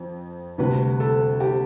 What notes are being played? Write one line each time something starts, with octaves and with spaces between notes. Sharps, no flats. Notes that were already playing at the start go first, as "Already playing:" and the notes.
Already playing: F2
D2 C3 G3 B4
A4
G4